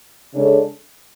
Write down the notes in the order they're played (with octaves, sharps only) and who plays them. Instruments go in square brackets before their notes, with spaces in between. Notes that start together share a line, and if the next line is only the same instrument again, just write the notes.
[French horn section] C#3 G#3 D4 A4 C#5